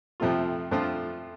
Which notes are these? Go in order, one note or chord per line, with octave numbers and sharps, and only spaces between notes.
F2 C3 F3 A3 F4
F2 F3 A3 D4 F4